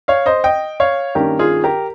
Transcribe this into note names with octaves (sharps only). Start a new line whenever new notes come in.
C#5 F5
C5 D#5
D#5 G5
C#5 F5
G2 D#3 A#3 C#4 G4 A#4
F4 G#4
G4 A#4